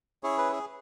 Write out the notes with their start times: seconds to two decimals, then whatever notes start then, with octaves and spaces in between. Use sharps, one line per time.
0.23 C#4 E4 G#4 C#5
0.38 B4
0.52 G#4